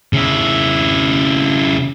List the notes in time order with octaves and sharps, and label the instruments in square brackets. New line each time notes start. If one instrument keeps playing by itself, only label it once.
[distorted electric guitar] C#3 E4